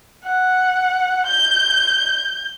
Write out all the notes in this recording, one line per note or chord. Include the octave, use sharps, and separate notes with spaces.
F#5
G6